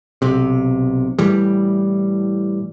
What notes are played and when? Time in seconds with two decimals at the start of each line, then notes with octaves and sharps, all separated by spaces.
0.22 B1 C3
1.19 A2 E3 G3